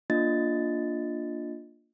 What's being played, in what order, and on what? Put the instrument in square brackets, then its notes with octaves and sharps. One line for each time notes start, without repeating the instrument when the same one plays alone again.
[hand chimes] A#3 D4 F4 D#5 A6